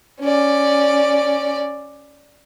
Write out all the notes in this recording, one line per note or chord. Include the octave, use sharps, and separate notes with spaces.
C#4 D5